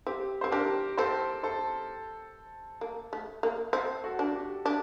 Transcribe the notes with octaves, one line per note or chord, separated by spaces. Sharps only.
C4 G4
C4 C5
D4 G4 A#4
C4 A4 C5
A4 C5
A#3
A3
A#3
C4 A4 C5
F#4 A4
D4
G4
D4 G4